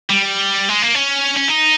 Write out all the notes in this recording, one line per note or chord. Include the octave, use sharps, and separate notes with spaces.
G3
G#3
A#3
C#4
C#4
D#4